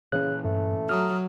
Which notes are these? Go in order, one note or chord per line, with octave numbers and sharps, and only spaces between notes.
A#2 C#3 E3 C#4 F#6
G2 A3
F#3 A#5 D#6 F6